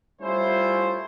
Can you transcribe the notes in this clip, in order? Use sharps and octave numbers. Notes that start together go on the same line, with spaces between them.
G3 A3 C#4 E4 F4 C5